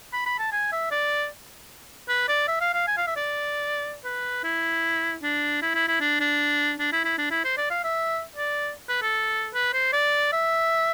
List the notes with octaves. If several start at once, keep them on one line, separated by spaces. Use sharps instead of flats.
B5
B5
A5
G#5
E5
D5
B4
D5
E5
F5
F5
G#5
F5
E5
D5
B4
E4
D4
E4
E4
E4
D4
D4
D4
E4
E4
D4
E4
C5
D5
F5
E5
D5
B4
A4
B4
C5
D5
E5